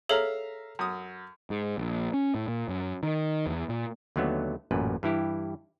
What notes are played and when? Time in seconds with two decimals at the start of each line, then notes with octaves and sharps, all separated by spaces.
0.09 G#4 A4 C#5 E5 F5 A#5
0.79 F#2 D#6
1.50 G#2
1.78 A#1
2.14 C#4
2.35 A2
2.48 A#2
2.68 F#2
3.03 D#3
3.46 E2
3.69 A#2
4.16 D#2 D3 F#3 A3 B3
4.71 A1 F#2 A#2 B4
5.03 G2 E3 E4 G4